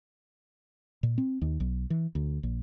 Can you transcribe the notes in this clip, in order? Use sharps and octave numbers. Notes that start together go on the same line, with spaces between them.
A#2
C4
D#2
B1
E3
D2
A#1